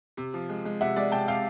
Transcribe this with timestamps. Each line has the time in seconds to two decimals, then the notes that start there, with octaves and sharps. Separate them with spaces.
0.17 C3
0.34 F3
0.49 G#3
0.65 G#3
0.81 C3 E5 F#5
0.96 G#3 D5 E5
1.12 C3 G5 A5
1.28 C3 F5 G5